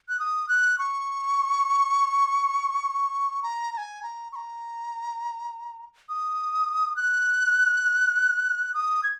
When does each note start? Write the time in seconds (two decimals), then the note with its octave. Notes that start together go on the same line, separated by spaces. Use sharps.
0.09 F#6
0.19 D#6
0.49 F#6
0.78 C#6
3.43 A#5
3.73 A#5
3.78 G#5
4.03 A#5
4.32 C#6
4.36 A#5
6.09 D#6
6.96 F#6
8.74 D#6
9.03 G#6